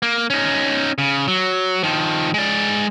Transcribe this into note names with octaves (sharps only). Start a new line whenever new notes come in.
A#3
C#4 D#4
C#3
F#3
D#3 F3
G#3 D5